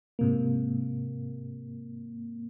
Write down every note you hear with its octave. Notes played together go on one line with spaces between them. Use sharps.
G#2 C3 A#3